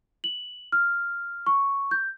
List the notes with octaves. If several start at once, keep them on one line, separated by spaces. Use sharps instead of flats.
F#7
F6
C#6
G6